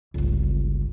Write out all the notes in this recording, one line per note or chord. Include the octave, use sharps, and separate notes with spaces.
G1 C#2